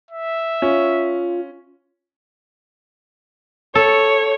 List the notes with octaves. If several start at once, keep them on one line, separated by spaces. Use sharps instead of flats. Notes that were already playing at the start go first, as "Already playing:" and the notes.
E5
C#4 F4
A4 C#5